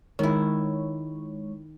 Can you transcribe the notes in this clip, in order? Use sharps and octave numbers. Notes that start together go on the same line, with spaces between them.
D#3 G#3 E4 C#5